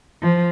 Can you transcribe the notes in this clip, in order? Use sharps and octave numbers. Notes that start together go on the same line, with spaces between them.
F3